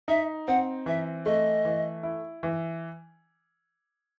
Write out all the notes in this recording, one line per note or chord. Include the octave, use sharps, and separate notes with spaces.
D#4 E5
C4 F#5
E3 E5
A3 D#5
E3
E4
E3